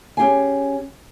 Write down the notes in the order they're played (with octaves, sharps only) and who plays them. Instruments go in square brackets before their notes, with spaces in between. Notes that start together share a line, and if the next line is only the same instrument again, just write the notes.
[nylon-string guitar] C#4 G4 G#4 G#5